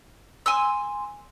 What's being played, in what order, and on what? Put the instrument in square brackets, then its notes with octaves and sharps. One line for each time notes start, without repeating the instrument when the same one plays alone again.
[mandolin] G#5 C6 E6